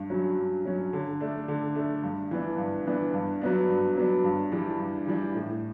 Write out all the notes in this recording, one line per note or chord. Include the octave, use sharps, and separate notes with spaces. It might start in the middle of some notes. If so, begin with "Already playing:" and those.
Already playing: G2
F#3 C#4
G2
F#3 C#4
D3
A3 D4
D3
A3 D4
G2
E3 B3 D4
G2
E3 B3 D4
G2
F#3 B3 D4
G2
F#3 B3 D4
G2
E3 G3 D4
G2
E3 G3 D4
A2